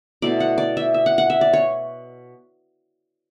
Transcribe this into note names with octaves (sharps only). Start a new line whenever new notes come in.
B2 A3 E4 D5
F#5
D5
E5
E5
F#5
F#5
E5
D5
C#5